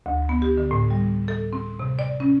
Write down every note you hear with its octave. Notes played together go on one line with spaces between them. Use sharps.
D2
B3
G4
D3
A2
G3
A4
C4
C3
D5
C#4